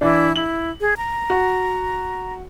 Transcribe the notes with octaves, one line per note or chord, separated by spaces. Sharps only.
E3 D4 E4
E4 F#7
G#4
A#5
F#4